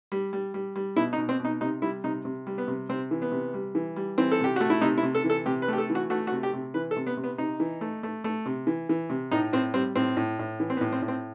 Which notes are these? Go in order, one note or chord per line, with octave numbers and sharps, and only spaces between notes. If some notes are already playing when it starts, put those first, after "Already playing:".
G3
G3
G3
G3
B2 E4
D#4
B2
C4
B2 D#4
C3 D#4
G3 E4
C3 D#4
C3
G3
B3
C3
C3 C4
E3
B3
C3
G3
E3
G3
E3 C4
A4
C3 G4
A3 F#4
E4
C3 D#4
E4
C3
A4
E3
A4
C3 G4
B4
A3 G4
A4
E3
F#4
A3 F#4
F#4
C3
G4
C3
E3 B4
A4
C3
B3
C3
B3
C3 D#4
E3
A3
A3
A3
C3
E3
E3
C3
A2 D#4
A2 C4
G3 C4
A2 C4
A2
A2
E3
C4
B3
A2
C4
A2
C4